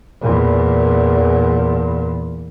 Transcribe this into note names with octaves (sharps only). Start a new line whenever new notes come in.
E2 A#2